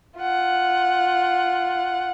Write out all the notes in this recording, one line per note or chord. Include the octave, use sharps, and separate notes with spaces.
F4 F#5